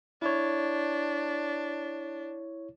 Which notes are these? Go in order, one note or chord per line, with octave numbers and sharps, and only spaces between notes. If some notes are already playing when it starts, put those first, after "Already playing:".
D4 E4 C#5